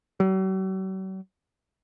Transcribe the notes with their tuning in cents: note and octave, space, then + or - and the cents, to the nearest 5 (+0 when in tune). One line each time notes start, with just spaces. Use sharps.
F#3 +45